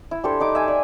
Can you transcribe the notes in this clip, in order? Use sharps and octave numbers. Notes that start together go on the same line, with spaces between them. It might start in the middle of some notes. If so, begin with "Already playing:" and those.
E4
D4 G4 A4 C5
D4 D#4 D6
E5 G#5
D5